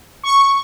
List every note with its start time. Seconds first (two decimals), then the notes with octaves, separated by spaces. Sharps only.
0.23 C#6